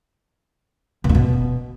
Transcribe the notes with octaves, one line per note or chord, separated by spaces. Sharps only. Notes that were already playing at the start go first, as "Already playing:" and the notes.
B2
A#2
B2